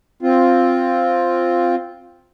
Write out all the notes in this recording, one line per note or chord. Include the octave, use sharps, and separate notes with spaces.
C4 F4